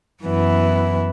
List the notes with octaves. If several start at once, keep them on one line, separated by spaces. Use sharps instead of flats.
F#2 E3 B3 E4